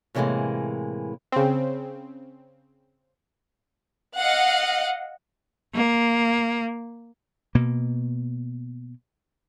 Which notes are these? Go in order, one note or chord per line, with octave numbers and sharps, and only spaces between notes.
A2 C3 E3 F3 G#3 A#3
C#3 C4
D#5 F5 F#5
A#3
B2 A#3